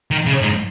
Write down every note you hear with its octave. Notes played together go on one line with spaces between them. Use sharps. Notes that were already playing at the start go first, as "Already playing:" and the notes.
D#3
C#3
G#2